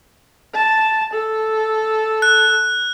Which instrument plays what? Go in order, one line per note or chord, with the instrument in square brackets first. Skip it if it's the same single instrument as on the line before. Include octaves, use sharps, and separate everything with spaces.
[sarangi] A5
A4
[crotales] F#6